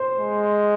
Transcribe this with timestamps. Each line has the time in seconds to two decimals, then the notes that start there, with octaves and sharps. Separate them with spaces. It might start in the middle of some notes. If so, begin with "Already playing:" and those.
Already playing: C5
0.19 G#3